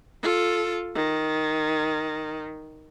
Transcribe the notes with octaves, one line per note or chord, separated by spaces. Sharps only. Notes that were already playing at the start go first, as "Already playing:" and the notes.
F4 A4
D#3